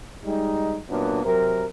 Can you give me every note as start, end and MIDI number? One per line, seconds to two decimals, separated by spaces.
0.25 0.77 55
0.25 0.77 56
0.25 0.77 63
0.89 1.21 42
0.89 1.21 46
0.89 1.21 58
0.89 1.21 59
0.89 1.21 62
1.24 1.65 48
1.24 1.65 54
1.24 1.65 70